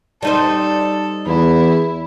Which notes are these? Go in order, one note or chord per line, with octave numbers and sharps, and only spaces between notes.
G3 D#4 A4 C5
E2 E4